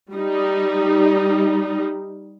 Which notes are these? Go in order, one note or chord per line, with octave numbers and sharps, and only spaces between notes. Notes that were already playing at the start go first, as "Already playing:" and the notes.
G3 D#4